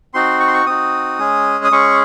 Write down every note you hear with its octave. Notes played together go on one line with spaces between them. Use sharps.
C4 D#4 F#4 C6
C#6
C6
C#6
C4 D#4 F#4 D#6
G#3 C#4 G#4
D#6
G#3 C#4 G#4 C#6